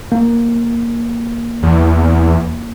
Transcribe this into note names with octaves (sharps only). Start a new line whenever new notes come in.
A#3
E2